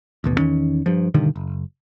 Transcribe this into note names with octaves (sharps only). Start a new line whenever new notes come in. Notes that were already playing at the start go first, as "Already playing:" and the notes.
A1 D#2 B2
E2 D#3 C#4
G2 F3
G2 B2 D3 D#3
F#1